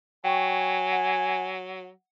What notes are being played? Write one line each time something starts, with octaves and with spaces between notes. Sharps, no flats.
F#3 G5 G#5 C#6
F#5